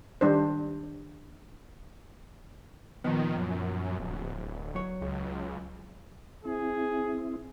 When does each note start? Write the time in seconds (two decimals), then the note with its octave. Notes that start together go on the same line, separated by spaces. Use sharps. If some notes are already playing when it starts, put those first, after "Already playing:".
0.21 D#3 G3 D4 C5
3.04 A#2 D#3 F3 B3
3.37 F#2
4.00 D1
4.75 F#3 C#5
5.01 C#2
6.45 C4 E4 G#4